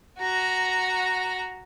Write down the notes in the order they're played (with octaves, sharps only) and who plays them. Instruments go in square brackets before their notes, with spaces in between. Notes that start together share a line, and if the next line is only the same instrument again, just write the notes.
[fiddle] F#4 A#5